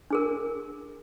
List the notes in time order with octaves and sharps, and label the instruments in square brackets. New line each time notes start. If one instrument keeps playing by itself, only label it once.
[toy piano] D4 G#4 A#4